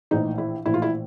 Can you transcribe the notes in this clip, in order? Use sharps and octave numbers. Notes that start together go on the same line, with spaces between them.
A#1 A2 E3 D#4
E4
A#1 A2 E3 E4
F4
E4